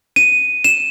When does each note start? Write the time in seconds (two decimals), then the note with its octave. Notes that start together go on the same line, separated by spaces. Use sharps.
0.16 D#7
0.64 E7